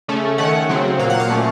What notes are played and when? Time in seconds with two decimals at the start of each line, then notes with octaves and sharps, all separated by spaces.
0.08 C#3 A3 C#4
0.38 D#3 A3 C#4 F#5
0.69 C#3 F#3 C4
0.99 A#2 F#3 A#3 F5
1.10 F#5
1.20 F5
1.29 A#2 A3 C#4